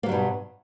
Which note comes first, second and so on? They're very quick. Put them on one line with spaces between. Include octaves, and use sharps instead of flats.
A#3 F#3 G3 G2 B2